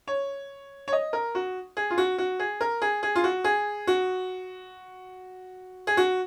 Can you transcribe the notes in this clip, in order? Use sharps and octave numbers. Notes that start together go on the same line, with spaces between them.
C#5
C#5
D#5
A#4
F#4
G#4
F4
F#4
F#4
G#4
A#4
G#4
G#4
F4
F#4
G#4
F#4
G#4
F#4